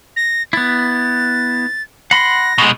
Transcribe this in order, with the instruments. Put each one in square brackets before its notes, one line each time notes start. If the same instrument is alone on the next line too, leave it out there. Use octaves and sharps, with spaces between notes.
[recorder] A#6
[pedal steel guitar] B3 E4 [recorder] A6
[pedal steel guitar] F#5 B5 C6 [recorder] A#6
[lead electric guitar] B2 G#3